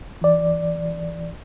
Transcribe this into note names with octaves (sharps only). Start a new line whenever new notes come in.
E3 D5